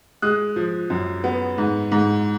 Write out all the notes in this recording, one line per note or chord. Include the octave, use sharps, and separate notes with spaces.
G#3 D#6 F#6
F3
F#2
B3
G#2
G#2